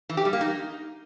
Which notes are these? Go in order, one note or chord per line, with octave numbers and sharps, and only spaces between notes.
E3
G4
G3
A#3
D#4